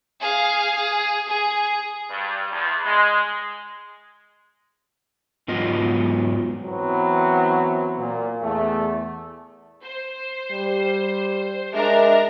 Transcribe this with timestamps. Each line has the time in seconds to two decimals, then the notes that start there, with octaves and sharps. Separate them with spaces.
0.20 G#4 F5
0.76 G#4
1.29 G#4
2.10 G2
2.52 E2
2.85 G#3
5.48 G#2 F#3 B3 F4 D#5
6.66 E3 F#3 B3 C4
7.98 A#2
8.42 E2 A3
9.83 C5
10.51 G3
11.74 G#3 D4 A#4 E5 A#5